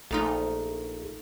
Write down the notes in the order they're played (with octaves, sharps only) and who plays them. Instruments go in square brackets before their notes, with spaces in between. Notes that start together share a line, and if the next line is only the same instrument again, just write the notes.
[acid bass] A#1 [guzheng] A3 D#4 F4